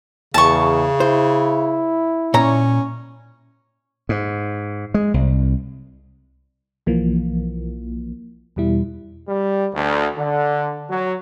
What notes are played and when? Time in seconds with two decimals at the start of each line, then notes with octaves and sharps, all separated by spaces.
0.34 E2 C#3 A5 C#6
1.00 E4 C5
2.34 A#2 C#4 C#5 A#5
4.09 G#2
4.94 G#3
5.14 C2
6.86 B1 E3 F3 A#3
8.56 E2 B2 G3 E4
9.29 G3
9.74 D2
10.19 D3
10.90 F#3